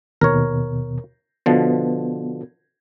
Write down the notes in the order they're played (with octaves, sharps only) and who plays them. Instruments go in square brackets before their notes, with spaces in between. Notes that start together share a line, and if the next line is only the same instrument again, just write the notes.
[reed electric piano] D#2 B2 [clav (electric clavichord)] A#4 C#5
[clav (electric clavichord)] B2 D3 F3 [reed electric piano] B3